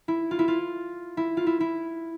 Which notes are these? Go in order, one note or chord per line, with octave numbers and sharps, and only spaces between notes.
E4
F4
E4
F4
E4
F4
E4
E4